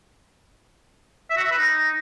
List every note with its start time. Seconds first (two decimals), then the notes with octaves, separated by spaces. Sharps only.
1.30 E5
1.37 F#4
1.44 E5
1.51 B4
1.58 D#4